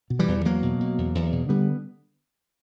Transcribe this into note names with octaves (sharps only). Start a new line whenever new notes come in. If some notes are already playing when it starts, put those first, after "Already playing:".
B2
E3 G3
E2
E2 F#3 A#3
B2
B2
E2
E2
B2
D3 G3 B3